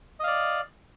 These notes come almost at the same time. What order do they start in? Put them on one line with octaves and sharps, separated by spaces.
D#5 F5 D5